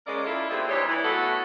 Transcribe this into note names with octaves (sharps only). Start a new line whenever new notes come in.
C#3 G#3 A#3 A#4 D5 D#5
E4 F4 A4
A#2 G3 C4 D4 E4 G#4
D2 E3 G3 D#4 C#5
E3
A3 B3 F#4 A4